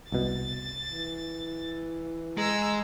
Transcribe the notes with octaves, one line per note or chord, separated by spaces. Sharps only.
C2 B2 A6
E3
G#3 A#5 E6